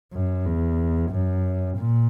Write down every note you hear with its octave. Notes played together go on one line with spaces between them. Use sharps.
F#2
E2
F#2
A#2